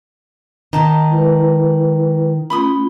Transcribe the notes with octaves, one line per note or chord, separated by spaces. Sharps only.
D#3 D#4 A5 A#5
G#3 E4 B4
A3 C#4 F4 B5 C6 D#6